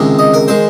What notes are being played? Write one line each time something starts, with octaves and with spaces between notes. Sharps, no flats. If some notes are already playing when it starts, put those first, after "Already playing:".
Already playing: C#2 C3 D#3 G#3
D#5
A#4
D#3 G#3 C5